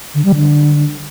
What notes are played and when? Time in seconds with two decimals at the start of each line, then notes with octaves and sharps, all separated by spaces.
0.14 D3
0.25 G3
0.35 D3